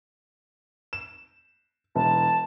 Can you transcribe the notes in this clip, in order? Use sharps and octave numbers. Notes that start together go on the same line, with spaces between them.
E7
E1 A5